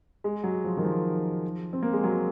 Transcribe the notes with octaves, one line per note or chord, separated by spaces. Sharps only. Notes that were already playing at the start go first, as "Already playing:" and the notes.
G#3
F#3
F3
D#3
F3
C4
A#3
G#3
F#3